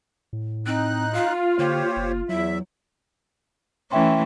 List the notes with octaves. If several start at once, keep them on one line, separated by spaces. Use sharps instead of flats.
A2
C4 D#4 F#6
F4 F5
D3 A#3 G4 C5 C#5
F#1
E2 F#3 E4 E5
E3 A3 C#4 E5 G5 C6